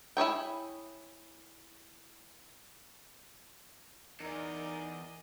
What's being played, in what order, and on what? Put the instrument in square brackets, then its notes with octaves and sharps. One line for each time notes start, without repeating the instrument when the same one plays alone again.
[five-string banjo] E4 G#4 C#5 G5
[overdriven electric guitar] E2 [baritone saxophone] D#4 [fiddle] G#4 D#5 [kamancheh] A#4 D5